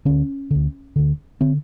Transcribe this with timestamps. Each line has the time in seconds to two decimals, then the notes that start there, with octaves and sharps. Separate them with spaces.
0.05 D2 D3 C#4
0.51 D2 D3
0.96 D2 D3
1.41 D3 C4